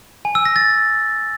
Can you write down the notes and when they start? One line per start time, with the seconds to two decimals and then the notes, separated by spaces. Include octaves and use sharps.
0.25 G#5
0.35 E6
0.45 A#6
0.56 A6